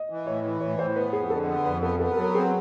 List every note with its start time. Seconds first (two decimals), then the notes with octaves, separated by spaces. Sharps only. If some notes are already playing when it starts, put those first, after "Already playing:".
Already playing: D#5
0.10 E3
0.26 A2 C#5
0.44 E3
0.61 A2 C#5
0.79 A2 C5
0.95 B3 B4
1.13 F2 G#4
1.30 D3 A4
1.47 B3
1.65 F2 B4
1.82 B3 A4
2.00 B3 A4
2.11 A#4
2.17 F#3 A4
2.35 C4 G#4